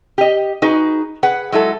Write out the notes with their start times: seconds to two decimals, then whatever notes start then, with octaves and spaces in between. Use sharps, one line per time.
0.18 G4 D#5
0.62 D#4 F#4 G#4 B4
1.23 G#4 B4 F#5
1.52 F#3 G#3 E4 A4